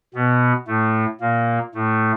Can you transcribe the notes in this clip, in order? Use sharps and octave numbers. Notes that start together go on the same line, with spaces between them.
B2 B3
A2 A3
A#2 A#3
A2 A3